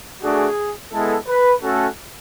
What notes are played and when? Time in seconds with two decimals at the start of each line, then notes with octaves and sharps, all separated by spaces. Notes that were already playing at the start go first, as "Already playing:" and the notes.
0.23 A3 D4 F#4 G#4
0.93 G#3 B3 E4 A4
1.29 B4
1.63 A3 C#4 F#4 A4